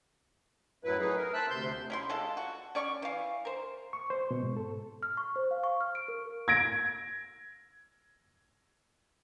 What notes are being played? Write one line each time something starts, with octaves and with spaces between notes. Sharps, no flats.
F#2 A2 F#3 E4 B4
F#3 A3 D#4 G#4 B4
A#4
C5 E5 A5 E6 F#6
D2 C3 C6 G6
C#4 E4 C6
C3 G#3 F4 A4
F#4
C#4 D5 C#6
E3 F5
A#4 C5
C#6
C5
B2
G#2
A4
F6
C#6
C5
F5
C#6
F6
D7
A#4
G#6 A#6 D7